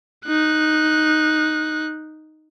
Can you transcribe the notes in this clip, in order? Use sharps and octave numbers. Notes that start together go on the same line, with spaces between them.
D#4 F#6